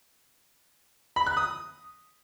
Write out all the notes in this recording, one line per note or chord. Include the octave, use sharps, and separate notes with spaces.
B5
F#6
D#6